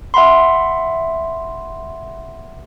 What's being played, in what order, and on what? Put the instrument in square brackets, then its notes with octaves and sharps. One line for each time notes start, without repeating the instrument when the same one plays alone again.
[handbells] E5 F#5 B5 C6